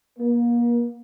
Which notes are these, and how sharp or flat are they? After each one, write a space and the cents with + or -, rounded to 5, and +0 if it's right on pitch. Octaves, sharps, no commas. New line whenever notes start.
A#3 +35